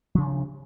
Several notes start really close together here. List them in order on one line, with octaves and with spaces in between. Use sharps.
F3 C3 D4